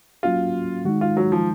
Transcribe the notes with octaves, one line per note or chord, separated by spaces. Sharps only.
F#3 A#3 C#4 F4 F#4
D#3 G#3 D#4 F#4
F4
F#3
F3